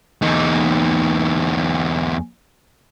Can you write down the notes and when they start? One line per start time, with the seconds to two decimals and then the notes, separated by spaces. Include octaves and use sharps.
0.22 E2 D#4